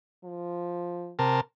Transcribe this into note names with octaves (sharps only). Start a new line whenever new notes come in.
F3
C3 A#4 A5